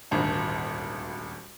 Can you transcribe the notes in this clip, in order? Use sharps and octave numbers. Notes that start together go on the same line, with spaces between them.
D#1 G#1 D2